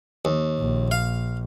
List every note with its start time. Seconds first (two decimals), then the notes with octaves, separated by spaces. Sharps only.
0.25 D#2
0.59 A#1
0.91 F5